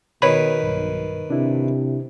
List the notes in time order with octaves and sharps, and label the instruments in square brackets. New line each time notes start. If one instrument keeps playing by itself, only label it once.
[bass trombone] B2 [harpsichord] D#3 B4 [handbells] C#5 B5
[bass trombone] B1 [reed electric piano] G2
[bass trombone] C3 [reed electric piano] D4 E4